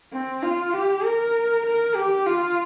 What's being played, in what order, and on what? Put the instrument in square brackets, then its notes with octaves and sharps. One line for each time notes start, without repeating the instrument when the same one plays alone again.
[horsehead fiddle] C4
F4
G4
A#4
A#4
G4
F4